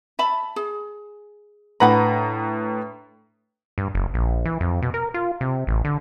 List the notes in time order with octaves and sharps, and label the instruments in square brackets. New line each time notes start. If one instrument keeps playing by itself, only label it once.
[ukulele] E5 A5 B5
G#4
[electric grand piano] A2 B4 A#5 [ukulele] D4 F#5 B5
[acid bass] G2
F#1
A#1
E3
F2
B2
A#4
F4
C3
A1
D3